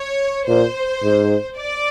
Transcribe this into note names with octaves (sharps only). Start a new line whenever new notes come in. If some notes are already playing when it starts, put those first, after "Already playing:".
Already playing: C#5
A#2 C5
G#2
D5